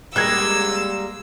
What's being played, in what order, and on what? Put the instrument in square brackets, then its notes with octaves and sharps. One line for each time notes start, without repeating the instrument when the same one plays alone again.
[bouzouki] G3 G#3 A#3 [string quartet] E6 [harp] F#6 G#6 A#6